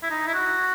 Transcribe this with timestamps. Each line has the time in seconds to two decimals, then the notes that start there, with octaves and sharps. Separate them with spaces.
0.03 E4
0.10 D#4
0.27 E4
0.34 F#4